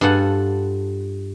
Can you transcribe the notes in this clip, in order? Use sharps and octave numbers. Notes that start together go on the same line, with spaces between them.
G2 F4 A4 F#5 G#5